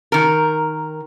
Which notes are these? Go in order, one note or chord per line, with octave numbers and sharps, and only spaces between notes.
D#3 A#4